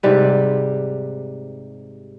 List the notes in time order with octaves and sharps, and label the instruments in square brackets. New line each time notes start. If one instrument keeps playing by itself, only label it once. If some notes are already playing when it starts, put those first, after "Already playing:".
[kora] G#2 C3 G3 B4